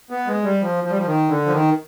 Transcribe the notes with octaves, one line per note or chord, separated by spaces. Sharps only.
B3
G#3
G3
F3
F3
G3
F3
D#3
D3
F3
D#3